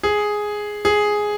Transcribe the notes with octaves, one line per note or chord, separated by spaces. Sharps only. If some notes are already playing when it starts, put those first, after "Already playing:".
G#4
G#4